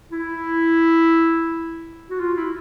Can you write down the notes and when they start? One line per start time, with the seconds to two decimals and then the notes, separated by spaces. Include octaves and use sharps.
0.12 E4
2.10 F#4
2.20 F4
2.37 E4